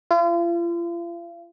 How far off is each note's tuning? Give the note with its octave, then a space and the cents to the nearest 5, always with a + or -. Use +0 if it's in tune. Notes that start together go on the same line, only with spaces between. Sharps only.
F4 -40